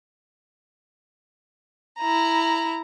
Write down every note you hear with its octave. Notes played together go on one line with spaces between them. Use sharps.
E4 A#5